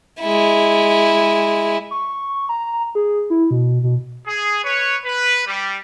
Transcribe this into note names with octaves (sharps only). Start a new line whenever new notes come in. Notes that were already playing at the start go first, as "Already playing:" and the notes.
G#3 E4
C#6
A#5
G#4
E4
B2
B2
G#4
B4 C#5
B4
G3